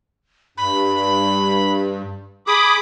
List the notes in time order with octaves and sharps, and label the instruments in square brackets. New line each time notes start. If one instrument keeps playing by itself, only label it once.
[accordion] G2 [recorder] B5
[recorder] G#4 [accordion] B5 D6 D#6